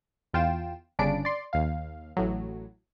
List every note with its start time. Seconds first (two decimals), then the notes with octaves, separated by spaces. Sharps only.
0.34 E2 F4 G5 E7
0.99 G1 C#3 D4 D5 D7
1.25 D5 C6
1.53 D#2 F5
2.17 A1 A2 F#3